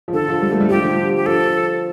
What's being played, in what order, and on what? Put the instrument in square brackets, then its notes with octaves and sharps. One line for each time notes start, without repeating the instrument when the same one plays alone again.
[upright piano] F3
[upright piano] D3 [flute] A4
[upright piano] F3
G3
A3
G3
[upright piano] F3 [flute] G4
[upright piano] F3
D3
[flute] G4
[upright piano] F3 [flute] A4